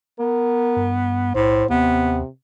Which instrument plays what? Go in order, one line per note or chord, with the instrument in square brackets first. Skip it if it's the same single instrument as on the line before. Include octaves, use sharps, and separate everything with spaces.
[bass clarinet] B3 [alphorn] A#4
[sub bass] G2
[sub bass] B1 [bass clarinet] A2 [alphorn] C5
[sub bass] D#2 [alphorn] C3 [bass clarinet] B3